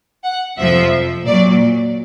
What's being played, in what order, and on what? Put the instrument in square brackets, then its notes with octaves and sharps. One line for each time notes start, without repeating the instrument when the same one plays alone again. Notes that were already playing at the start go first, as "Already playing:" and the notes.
[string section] F#5
F2 C3 F3 E5
A#2 F#3 D5